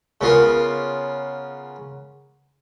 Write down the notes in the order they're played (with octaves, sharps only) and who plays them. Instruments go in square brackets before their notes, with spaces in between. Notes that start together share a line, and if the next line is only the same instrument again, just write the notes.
[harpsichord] C#3 B3 F4 A#4